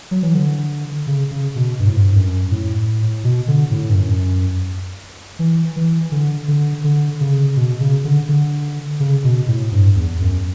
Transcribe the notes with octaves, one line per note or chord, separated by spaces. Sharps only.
F#3
E3
D3
C#3
C#3
B2
G2
A2
G2
F#2
A2
B2
D3
A2
G2
F#2
E3
E3
D3
D3
D3
C#3
B2
C#3
D3
D3
C#3
B2
A2
G2
E2
F#2